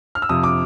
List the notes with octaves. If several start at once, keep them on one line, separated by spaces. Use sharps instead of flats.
F6
E6
F2 C3 F3 D#6
D6